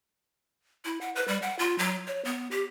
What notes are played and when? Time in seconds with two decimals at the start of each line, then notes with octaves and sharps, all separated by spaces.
0.85 E4
1.01 F#5
1.16 B4
1.28 G3
1.42 F#5
1.59 F4
1.78 F#3
2.07 C#5
2.25 B3
2.51 G4